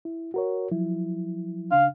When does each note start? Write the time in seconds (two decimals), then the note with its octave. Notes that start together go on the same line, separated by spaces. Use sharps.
0.05 E4
0.34 F#4 A#4 C#5
0.71 F3 F#3 E4
1.71 C#3 D4 F5